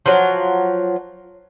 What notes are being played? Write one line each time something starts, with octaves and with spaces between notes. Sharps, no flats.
F3 F#3